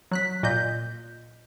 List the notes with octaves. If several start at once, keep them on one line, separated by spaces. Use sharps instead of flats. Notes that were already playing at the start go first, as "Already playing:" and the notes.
F#3 F#6 B6
A#2 D#5 G6